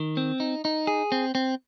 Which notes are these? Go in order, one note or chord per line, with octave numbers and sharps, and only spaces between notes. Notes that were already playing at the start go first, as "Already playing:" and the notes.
Already playing: D#3
C4
D#4
D#4
G#4
C4
C4